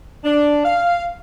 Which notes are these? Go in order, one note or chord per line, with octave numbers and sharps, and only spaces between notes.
D4
F5